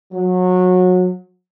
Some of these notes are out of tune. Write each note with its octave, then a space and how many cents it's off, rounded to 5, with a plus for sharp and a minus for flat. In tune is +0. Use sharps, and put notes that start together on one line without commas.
F#3 -25